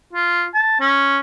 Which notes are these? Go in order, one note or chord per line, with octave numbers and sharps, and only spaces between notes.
F4
A5
C#4